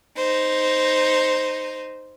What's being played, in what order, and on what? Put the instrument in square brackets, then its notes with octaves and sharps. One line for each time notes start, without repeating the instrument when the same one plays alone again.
[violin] D#4 C5